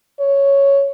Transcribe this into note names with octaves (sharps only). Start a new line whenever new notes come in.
C#5